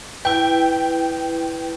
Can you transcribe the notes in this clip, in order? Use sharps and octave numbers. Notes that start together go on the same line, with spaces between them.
E4 B4 G5